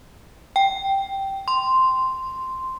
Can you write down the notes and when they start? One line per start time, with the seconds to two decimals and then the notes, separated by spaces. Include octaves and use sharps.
0.56 G5
1.48 C6